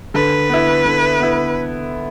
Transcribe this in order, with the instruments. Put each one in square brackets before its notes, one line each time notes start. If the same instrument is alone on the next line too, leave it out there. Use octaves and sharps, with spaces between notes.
[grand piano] D3 [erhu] B4
[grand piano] B3 E4
D3
B3 E4